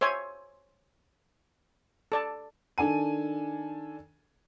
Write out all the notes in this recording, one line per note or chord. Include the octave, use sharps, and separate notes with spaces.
C5 C#5 E5 G#5
A4 D5 A5
D#3 D4 A4 G#5 D#7